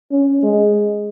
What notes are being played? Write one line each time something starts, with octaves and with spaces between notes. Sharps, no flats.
C#4
G#3